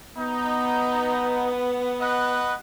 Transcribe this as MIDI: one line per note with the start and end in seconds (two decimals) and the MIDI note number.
0.17 2.58 59
0.17 1.49 63
2.00 2.54 71
2.00 2.54 75
2.00 2.54 78